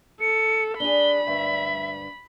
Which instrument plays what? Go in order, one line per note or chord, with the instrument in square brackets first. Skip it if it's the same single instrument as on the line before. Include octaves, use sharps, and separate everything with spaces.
[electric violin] A4 [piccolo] C#7
[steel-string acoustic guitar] D4 G#4 [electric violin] B5 [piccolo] G7
[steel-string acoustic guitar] D2 G2 [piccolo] E5